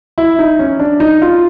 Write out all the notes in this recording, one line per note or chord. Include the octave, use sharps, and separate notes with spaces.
E4
D#4
C#4
D4
D#4
F4